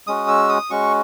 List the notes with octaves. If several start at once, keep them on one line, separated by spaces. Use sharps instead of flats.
G#3 C#4 F#4 D#6
E6
D#6
G#3 C#4 F#4 C#6